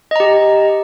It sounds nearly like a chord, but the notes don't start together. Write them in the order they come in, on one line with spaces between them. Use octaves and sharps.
D#5 A#5 G4